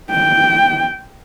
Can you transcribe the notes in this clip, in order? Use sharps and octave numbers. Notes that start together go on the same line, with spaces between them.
G5